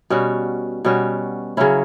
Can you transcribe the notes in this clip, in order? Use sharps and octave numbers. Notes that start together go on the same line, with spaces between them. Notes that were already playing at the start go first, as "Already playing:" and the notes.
B2 G3 C#4 F#4
B2 G3 C#4 F#4
C#3 F#3 C#4 E4